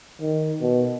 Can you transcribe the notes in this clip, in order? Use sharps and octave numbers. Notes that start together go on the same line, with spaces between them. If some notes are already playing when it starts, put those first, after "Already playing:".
D#3
B2